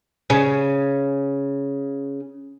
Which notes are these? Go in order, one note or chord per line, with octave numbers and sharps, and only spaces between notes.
C#3 C#4